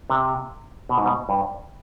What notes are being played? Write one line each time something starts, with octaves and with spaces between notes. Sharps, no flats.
C3
B2
G#2
B2
G2